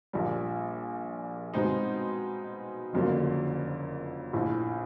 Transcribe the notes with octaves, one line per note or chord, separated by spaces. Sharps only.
A#1 A#2 G3
B2 G#3 C4 D#4
F#1 F2 D3 F#3 A#3
A#1 A2 F3